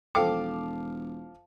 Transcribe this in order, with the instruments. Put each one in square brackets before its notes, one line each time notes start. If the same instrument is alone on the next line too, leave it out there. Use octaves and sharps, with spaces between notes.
[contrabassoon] E1 [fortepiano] F3 F5 D6 [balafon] A4 G5